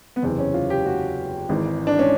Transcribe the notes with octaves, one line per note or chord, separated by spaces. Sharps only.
B3
F#1 E2 C3 E3 C4
C#4
F4
G4
F#4
G#1 G#2 E3
D4
C#4